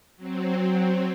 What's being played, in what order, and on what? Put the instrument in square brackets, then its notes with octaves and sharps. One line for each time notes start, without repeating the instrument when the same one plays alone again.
[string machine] F#3 C4